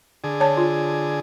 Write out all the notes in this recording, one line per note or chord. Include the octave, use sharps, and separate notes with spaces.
D3 G#4
C#5 A5
F4